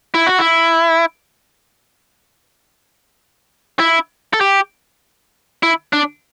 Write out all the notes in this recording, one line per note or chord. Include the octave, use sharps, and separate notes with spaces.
E4
F#4
E4
E4
A4
G4
E4
D4